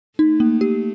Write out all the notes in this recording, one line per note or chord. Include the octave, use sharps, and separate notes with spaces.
A3 D#4
A#3
G4